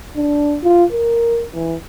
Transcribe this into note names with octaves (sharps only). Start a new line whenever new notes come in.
D4
F4
A#4
E3